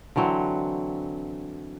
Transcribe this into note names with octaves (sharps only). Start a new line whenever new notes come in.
D3 E3 F#3 C4